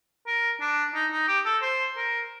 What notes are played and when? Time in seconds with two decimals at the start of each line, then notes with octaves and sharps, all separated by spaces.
0.27 A#4
0.61 D4
0.94 D#4
1.11 D#4
1.28 G4
1.45 A4
1.62 C5
1.97 A#4